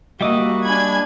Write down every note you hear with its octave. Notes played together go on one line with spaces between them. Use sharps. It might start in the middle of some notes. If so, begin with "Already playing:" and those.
G3 A#3 F#4 D#5 E5 D6 D#6
D4 G#5 B5 G#6